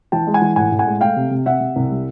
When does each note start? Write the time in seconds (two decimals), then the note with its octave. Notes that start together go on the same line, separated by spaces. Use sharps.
0.12 E3 G5 A5
0.27 G#3
0.34 F#5 G#5
0.42 E3
0.56 A2 F#5 G#5
0.72 A2
0.79 F#5 G#5
0.87 G#3
1.01 A3 F5 G5
1.17 C3
1.31 C3
1.46 C3 E5 F#5
1.60 C3
1.76 C2
1.91 G3